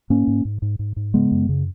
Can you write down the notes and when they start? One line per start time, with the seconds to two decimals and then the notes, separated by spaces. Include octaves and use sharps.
0.10 G#2 A#3 C#4
0.27 G#2
0.45 G#2
0.62 G#2
0.79 G#2
0.96 G#2
1.14 C#3 G#3 B3
1.32 F#2
1.49 C#3